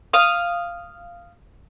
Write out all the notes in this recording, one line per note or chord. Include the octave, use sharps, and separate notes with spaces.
F5 D#6